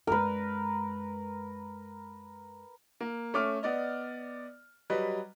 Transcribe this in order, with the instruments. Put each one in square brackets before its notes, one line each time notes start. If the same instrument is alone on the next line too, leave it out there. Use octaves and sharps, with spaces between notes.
[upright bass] F#2 G#3 [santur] A#4 B4
[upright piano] A#3
A3 C#4 D6 F6
B3 D5 D#5
F#3 G3 B4 D#5